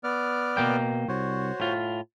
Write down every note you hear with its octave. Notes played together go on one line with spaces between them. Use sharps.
B3 D5 F6
B2 A#3 G5
C2 F#4 C5 C#5
A2 F4